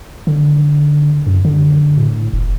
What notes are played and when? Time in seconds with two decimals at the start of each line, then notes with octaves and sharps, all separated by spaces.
0.27 D3
1.27 F#2
1.45 D3
1.97 A2
2.33 F1